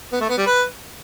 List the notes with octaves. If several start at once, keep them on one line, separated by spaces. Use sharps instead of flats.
B3
A3
B3
G3
B4